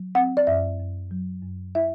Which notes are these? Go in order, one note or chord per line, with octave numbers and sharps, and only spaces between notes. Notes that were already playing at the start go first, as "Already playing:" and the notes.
Already playing: F#3
C4 F#5
D5
F#2 E5
F#2
F#3
F#2
E4 E5